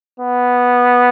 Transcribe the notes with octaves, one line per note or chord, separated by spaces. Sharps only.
B3